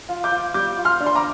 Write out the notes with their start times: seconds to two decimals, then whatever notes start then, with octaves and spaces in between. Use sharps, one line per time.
0.09 F4
0.24 D6 G6
0.31 F4
0.54 G3 D6 G6
0.77 F4
0.85 C6 F6
1.00 D4
1.06 C6
1.16 A#5 D6